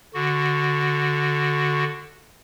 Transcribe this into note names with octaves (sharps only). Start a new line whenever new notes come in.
D3 F#4